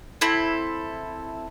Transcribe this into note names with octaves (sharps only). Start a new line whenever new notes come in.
C4 E4 A4